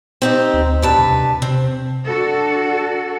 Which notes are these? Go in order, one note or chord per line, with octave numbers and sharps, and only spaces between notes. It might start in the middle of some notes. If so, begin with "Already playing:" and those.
C4 D#4 G4
D2
E2 G2 B4 A5
C3
C3 C4
D4 F#4 A4